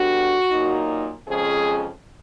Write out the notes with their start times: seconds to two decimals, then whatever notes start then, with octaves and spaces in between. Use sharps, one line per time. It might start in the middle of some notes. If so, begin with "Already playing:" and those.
Already playing: D3 G3 B3 D4 F#4
0.51 A#2 F#3 A#3 D#4
1.26 F2 C#3 F3 G#3 C#4 G#4